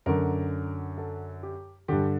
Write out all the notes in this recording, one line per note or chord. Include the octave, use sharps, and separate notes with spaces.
F#2 D3 A#4
A4
G4
G2 D3 G4